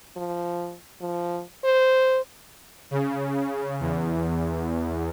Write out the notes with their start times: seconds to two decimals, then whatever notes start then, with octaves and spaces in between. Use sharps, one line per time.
0.17 F3
1.01 F3
1.65 C5
2.91 C#3
3.80 E2